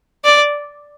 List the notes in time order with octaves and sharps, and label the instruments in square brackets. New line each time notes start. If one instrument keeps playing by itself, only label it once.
[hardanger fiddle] D5